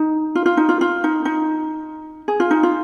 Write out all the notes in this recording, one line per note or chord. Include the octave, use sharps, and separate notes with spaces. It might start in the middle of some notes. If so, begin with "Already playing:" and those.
Already playing: D#4
F4
F4
D#4
F4
F4
D#4
D#4
G#4
F4
D#4
F4